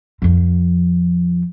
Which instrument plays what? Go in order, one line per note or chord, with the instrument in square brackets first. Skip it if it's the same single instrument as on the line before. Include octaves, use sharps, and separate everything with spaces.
[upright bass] F2 F3